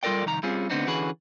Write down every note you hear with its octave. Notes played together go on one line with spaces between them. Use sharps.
G3 F4 A4 A#4 D5 G5
C2 F2 D#3 A#5
G3 C4 C#4 F4 G#4
D3 A3 B3 C4 D4 D#4
D3 E3 C#4 F#4 G#4 B4